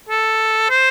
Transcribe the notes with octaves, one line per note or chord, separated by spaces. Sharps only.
A4
C5